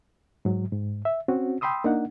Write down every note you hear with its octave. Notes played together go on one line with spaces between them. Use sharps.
G#2 F#3
G#2
E5
C4 C#4 F#4
G5 B5 C6 D#6 E6
A#3 D4 D#4 F#5